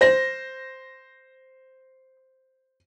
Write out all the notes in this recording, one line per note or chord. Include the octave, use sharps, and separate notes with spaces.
C5 A#6